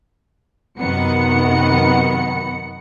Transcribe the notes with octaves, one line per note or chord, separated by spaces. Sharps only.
F#2 C3 D#3 B3 F#5 C#7